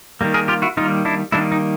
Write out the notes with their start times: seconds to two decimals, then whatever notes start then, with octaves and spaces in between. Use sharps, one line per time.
0.21 D#3 G3 A#3
0.34 G#4 A#4
0.48 F4 G4
0.62 E4 F#4
0.77 D#3 G3 A#3 D#4 F4
1.05 D4 E4
1.32 D#3 G3 A#3 D4 E4
1.52 D#4